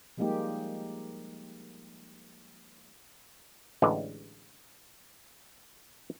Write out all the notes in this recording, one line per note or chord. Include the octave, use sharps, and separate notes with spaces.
F3 G3 G#3 A#3 D#4 G4
A1 D3 E3 G#3